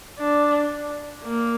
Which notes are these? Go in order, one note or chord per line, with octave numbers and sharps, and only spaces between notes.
D4
A#3